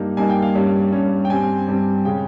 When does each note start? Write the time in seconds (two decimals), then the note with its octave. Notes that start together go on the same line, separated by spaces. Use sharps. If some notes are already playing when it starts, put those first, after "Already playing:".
Already playing: G2 G3 A#3 D#4
0.17 G2 G3 A#3 D#4 G#5
0.29 G5
0.42 F5
0.55 G2 G3 C#4
0.93 G2 G3 C#4
1.25 G5
1.30 G2 G3 C4 G#5
1.67 G2 G3 C4
2.05 C#3 G#3 C#4 G5